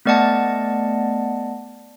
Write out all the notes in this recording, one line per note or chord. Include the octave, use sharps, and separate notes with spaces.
A3 B3 D5 D#5 F#5 A5